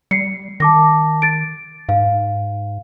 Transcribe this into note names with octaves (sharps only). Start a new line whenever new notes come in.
G3 C7 C#7
D#3 A5 D6 A#6
A6 D7
G#2 F5